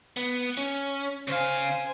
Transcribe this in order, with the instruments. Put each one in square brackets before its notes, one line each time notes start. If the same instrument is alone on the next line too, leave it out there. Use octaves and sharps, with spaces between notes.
[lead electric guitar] B3
C#4
[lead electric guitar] C#3 F5 [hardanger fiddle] C5 G#5